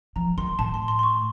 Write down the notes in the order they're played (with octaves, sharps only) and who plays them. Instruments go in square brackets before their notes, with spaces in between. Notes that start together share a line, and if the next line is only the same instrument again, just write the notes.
[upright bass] F3 [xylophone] A#5
[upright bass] D#3 [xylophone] C6
[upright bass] A2 [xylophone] A5
[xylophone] C6
C6
C6
C#6